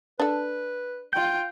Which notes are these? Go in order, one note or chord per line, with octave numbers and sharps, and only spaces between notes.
D4 A4 B4
F4 G5 G6